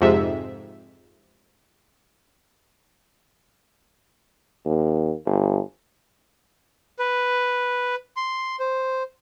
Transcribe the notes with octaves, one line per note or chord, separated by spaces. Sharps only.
F2 G#2 C3 E5
D#2
G1
B4
C6
C5